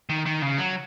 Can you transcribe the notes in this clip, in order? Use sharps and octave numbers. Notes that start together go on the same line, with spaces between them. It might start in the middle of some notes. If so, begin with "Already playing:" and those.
D#3
D#3
C#3
F#3